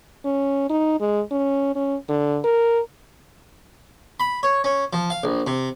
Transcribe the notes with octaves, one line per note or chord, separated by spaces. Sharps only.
C#4
D#4
G#3
C#4
C#4
D3
A#4
B5
C#5
C#4
F3
F5
A#1
C3